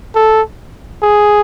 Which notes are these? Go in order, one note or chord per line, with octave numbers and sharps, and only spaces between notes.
A4
G#4